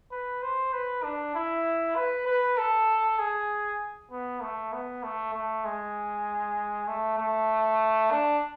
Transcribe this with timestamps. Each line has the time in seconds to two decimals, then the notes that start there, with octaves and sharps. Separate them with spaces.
0.12 B4
0.43 C5
0.73 B4
1.03 D4
1.35 E4
1.96 B4
2.27 B4
2.58 A4
3.19 G#4
4.11 B3
4.42 A3
4.73 B3
5.03 A3
5.34 A3
5.65 G#3
6.88 A3
7.19 A3
8.11 D4